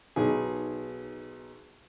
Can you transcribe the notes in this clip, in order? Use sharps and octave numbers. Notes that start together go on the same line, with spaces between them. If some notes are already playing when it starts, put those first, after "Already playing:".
B1 D#4 G#4